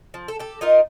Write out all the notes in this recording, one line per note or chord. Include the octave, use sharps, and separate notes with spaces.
F3
A4
G4 A4
D#4 F4 A#4 D#5